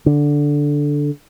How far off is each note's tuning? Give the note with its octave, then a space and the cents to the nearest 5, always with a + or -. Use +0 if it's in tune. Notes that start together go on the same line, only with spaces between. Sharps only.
D3 -5